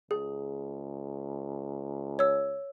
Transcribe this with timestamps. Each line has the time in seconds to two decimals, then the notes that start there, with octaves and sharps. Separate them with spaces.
0.11 C#2 G#4
2.19 C#5 E6